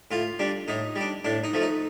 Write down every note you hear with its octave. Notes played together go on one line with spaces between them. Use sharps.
A2 F4
G3 D4
A2 D#4
G3
D4
A2 D4
D#4
F3 A3
D#4